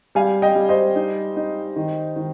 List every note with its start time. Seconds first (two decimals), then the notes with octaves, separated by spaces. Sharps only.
0.15 G3 F5 G#5
0.42 D#5 G5
0.55 G3
0.69 C5 D#5
0.95 D#4
1.36 D#4
1.76 D#3
2.16 D#3